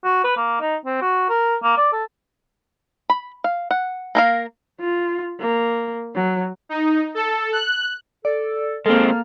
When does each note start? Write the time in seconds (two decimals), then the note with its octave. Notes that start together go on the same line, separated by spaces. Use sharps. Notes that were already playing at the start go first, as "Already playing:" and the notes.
0.04 F#4
0.24 B4
0.37 A#3
0.61 D#4
0.85 C4
1.02 F#4
1.29 A#4
1.63 A#3
1.77 D5
1.92 A4
3.10 B5
3.44 F5
3.71 F#5
4.15 A#3 A#4 F5
4.80 F4
5.40 A#3
6.15 F#3
6.69 D#4
7.15 A4
7.53 F#6
8.25 A4 D5
8.86 G#3 A#3 C4 A4 F6